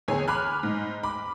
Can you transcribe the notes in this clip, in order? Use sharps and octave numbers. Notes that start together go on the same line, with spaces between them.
E2 D3 G#4 C#5 G#5
G#5 B5 D6 F6 F#6
G#2
B5 D6